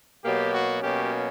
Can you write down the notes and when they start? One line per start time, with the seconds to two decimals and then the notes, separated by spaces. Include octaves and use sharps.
0.24 B2 F#3 A#3 G4
0.53 F#4
0.81 B2 F#3 A#3 C#4 G4